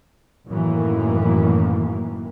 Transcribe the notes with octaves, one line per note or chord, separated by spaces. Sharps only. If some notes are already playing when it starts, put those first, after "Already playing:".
F#2 A2 D#3 E3 A#3